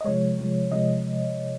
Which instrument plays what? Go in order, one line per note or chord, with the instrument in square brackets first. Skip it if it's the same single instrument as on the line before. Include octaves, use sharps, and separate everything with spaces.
[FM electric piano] D#5
C3 F3 G#3 C#5
C3 F3 G#3
C3 F3 G#3 D#5